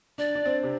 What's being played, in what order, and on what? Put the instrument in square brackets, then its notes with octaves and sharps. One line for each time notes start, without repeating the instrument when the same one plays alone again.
[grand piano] D4 [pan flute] D5
[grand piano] D4
C4
C3